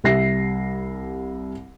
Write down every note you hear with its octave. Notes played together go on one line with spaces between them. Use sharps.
C2 G3 E5 A#6 C7